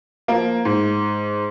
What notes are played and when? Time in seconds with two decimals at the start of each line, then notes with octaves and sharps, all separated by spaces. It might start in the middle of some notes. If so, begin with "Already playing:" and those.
0.28 F3 A#3
0.65 G#2